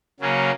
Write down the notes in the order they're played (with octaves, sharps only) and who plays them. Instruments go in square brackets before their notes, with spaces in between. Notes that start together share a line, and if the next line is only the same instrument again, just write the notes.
[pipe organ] C#3 F#3 A#3 C#4